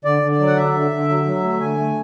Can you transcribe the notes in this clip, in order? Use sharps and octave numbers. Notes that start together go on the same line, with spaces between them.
D3 D5
D3
D5
F#3
F#5
D3 E5
D3
D3
F#3
F#3
A3
D3 G#5
A3